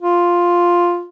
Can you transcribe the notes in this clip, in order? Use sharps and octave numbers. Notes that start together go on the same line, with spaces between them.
F4